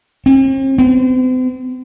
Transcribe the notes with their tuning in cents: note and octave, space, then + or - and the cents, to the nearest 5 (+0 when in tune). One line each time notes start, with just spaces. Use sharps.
C4 +45
C4 -45